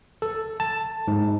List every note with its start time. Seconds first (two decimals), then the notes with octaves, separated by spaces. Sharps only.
0.22 A4
0.60 A5
1.08 G#2